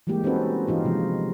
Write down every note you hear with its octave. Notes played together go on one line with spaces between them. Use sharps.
E3 G3 G#3 A#3 G4
C4 C#4 D#4 F#4 A4 B4
E3 D#4 F4 G4
C3 F3 G#3